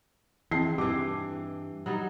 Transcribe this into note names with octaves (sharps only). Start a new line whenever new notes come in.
E3 C4 A5 C7
G2 E3 G4 D6
F#3 G3 D#4